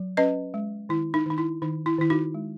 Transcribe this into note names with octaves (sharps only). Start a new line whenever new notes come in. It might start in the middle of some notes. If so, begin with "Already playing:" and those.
Already playing: F#3
C#4 B4 D#5
G#3
D#3 E4
D#4
D#3 D#4
E4
D#3 D#4
E4
D#3 E4
D#4 F#4
G#3